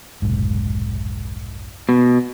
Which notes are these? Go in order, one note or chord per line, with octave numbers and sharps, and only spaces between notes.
F1 B1 G#2
B2